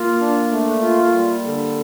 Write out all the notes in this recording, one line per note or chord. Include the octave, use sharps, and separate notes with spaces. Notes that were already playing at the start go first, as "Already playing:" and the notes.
Already playing: A#3 F4
D4
A3
F4
G3
D3